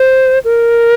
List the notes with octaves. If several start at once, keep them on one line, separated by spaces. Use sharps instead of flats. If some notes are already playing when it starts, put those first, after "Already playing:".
Already playing: C5
A#4